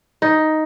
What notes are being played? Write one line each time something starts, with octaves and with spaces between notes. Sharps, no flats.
D#4